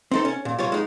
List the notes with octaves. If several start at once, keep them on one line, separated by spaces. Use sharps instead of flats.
C4 D#4 A4
C#4
A#2
G3 F4 C#5
G#3 D#4